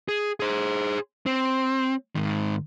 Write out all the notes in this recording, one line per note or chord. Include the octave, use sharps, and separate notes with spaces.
G#4
G#4 C5
C4
G#2 D#3